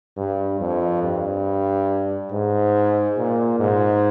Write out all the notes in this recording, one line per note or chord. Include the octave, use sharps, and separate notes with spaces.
G2
F2
G2
G#2
A#2
G#2